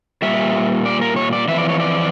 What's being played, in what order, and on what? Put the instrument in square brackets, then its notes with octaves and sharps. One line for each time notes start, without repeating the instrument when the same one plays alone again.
[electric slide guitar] A#2 G3 E5
D5
A#4
C#5
D5
F2 E3 E5
D5
C#5
D5